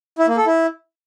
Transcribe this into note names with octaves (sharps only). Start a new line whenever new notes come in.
E4
A#3
A4
E4